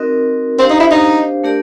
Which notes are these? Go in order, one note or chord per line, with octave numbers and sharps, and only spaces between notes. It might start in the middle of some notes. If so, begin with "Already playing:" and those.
Already playing: C4 D#4 F#4 A#4 D#5
C4 D4 G4 C5 F5
D#4
E4
D#4
A3 D4 G4 A#4 D5